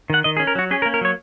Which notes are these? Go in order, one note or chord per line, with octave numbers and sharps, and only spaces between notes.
D#3 F#5
D#3 D#5
G#4
C#4
A#4
F#3 F#4
C#4 G#4
A#4
A#3
A#4
F#3 C#5